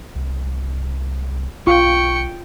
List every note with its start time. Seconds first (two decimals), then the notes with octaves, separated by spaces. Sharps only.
0.16 C2
1.67 B1 F4 G5 C#6 C#7